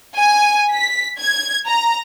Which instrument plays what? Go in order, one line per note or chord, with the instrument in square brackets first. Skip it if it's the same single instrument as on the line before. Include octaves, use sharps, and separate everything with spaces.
[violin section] G#5
B6
G#6
A#5